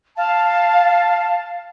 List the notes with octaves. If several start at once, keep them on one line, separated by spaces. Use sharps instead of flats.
F5 A5